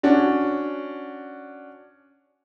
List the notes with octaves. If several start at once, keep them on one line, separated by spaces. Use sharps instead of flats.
C#4 D4 F#4